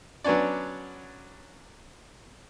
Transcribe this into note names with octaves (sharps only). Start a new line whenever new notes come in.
F#3 B3 C#4 D4 D5